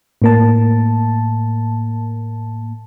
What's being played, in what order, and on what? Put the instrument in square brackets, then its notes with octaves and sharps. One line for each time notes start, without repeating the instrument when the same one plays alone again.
[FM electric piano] A2 A#3 A5